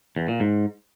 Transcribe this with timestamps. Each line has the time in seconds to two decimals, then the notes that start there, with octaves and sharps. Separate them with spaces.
0.16 E2
0.28 A#2
0.40 G#2